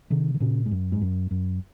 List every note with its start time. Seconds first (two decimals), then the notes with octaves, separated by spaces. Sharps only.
0.10 C3 D#3
0.34 D#3
0.40 A#2 C#3
0.66 G#2
0.71 F#2
0.92 G#2
1.02 F#2
1.31 F#2